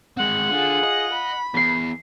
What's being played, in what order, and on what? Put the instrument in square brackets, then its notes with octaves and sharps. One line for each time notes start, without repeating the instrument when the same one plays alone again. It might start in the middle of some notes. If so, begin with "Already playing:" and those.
[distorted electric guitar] G#3 C4 [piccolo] F#5
[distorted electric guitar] D3 [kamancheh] F4 G#4
[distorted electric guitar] D#5
[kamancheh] B5
[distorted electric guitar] E2 [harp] B6 C7